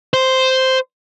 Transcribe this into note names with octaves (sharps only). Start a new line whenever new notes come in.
C5